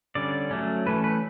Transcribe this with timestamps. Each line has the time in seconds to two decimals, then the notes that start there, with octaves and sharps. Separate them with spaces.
0.15 D3 G3 C#4 D5
0.51 F#3 A3 C#4
0.86 E3 A3 C#4 B4
1.04 B4